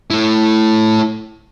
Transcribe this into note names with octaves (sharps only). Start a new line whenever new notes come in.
A3 E4